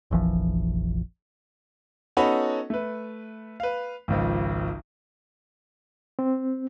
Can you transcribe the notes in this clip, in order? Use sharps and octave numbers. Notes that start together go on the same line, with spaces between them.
F1 A#1 E3 F3
B3 C#4 D#4 F#4 A4 B5
A3 B4
B4 F5
G#1 C#2 F3
C4